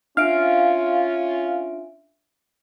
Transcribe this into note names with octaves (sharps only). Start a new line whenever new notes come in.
C#4 D4 F4 E5 F5 D7